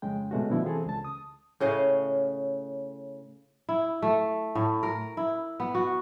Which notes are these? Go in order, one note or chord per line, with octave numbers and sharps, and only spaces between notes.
F2 C#3 G#3 G5
B2 G#3 A3 C#4 F#4
B2 D3 F3 E4
E3 C4 G#4 A4
C#2 A5
D#6
A2 C#3 D#5 F5
E4
A3
A2
A#4
E4
B3
F#4